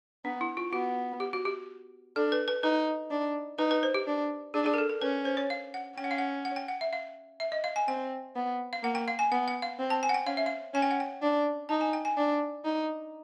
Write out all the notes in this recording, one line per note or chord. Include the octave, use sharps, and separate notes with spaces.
B3 D4
E4
F4
B3 F#4
G4
F#4
G4
D4 A4
B4
B4
D#4 B4
D4
D#4 B4
B4
C5
G4
D4
D4 G#4
G#4
A#4
A4
A#4
C#4 B4
C5
C#5
F5
F#5
C#4 G5
F#5
F5
F#5
F#5
G5
F#5
E5
F5
E5
D#5
F5
G#5
C4 G5
B3
F5
A#3 F#5
G5
F5
G#5
B3 F#5
F#5
F5
C4
A5
G#5
F#5
G5
C#4 F5
E5
F5
C#4 G#5
G5
F#5
G5
D4
D#4 A5
G#5
G5
G#5
D4
D#4